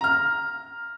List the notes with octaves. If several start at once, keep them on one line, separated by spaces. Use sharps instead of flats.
A#5 F6